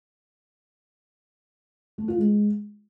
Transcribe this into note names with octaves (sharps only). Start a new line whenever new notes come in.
A3
F4
G#3